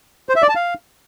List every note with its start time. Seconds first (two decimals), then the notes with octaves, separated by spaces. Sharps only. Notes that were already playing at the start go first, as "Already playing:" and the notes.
0.29 C5
0.36 E5
0.42 D5
0.49 A5
0.56 F5